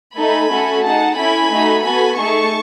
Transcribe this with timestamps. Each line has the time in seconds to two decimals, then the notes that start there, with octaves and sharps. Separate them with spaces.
0.16 A3 D#4 A4 G#5 B5
0.49 A3 C#4 F#4 A4
0.83 D#4 G#4 F#5 A5
1.17 C#4 E4 A4 G#5 B5
1.51 A3 D#4 F#4
1.84 B3 F#4 A4 G#5 B5
2.18 A3 D#4 G#4 A5 C#6